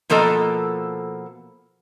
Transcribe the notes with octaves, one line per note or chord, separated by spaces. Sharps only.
B2 F3 A#3 A4 D#5